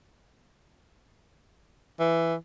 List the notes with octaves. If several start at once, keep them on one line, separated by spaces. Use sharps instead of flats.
E3